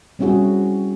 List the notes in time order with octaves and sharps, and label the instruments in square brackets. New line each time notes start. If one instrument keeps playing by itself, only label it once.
[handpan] G3 C4 C#4 E4 F#4 G#4